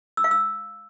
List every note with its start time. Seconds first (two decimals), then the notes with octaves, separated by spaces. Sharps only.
0.17 E6
0.24 F5
0.31 E6